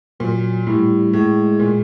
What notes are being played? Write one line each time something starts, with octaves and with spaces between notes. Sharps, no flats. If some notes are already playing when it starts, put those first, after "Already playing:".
A#2 F#3
A2 G3
A2 G#3
A#2